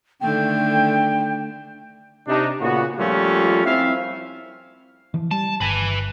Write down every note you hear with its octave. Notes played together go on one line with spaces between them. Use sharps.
D3 D#3 A3 G5
C3 D4 D#4
A#2 C#3 B3 F#4
F3 G3 A3 A#3 C#4 F4
C4 E4 E5 F5
E3 F3
G3 A5
G1 B4 G#5